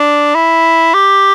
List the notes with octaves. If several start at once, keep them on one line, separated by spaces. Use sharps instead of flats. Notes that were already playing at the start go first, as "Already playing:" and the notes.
Already playing: D4
E4
G4